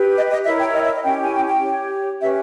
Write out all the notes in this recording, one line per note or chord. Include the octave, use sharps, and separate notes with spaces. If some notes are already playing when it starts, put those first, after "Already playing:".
Already playing: G4 B4
D#5
D#5
E4 A#4 C#5 E5
G5
D#5
E5
D#5
C#4 E4 G4 G5
G#5
G5
G5
G4 C#5
C#4 G4 B4 E5